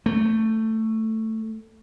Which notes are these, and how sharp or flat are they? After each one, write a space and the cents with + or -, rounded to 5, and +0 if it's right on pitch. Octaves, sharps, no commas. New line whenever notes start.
A3 +10